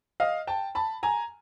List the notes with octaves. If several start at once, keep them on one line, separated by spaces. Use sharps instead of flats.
D#5 F5
G5 A5
A5 B5
G#5 A#5